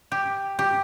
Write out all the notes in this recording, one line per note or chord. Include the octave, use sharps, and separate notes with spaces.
G4
G4